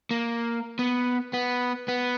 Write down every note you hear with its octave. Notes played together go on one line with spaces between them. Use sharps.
A#3
B3
B3
B3